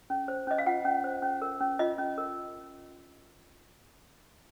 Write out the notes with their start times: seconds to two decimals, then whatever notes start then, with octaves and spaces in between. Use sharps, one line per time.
0.10 C#4
0.28 C5
0.47 C#4 D#5
0.58 F5
0.66 F4 F#5
0.85 C#4
1.04 C5
1.22 C#4
1.42 A#4
1.61 C#4
1.79 F4 D#5
1.98 C#4
2.18 A#4